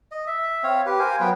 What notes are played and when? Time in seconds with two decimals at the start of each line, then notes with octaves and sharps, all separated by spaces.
0.11 D#5
0.27 E5
0.64 C4 C#5 F5
0.86 G4 B4
0.99 A#4 C5 F5 G#5
1.20 F#3 B3 B4 G5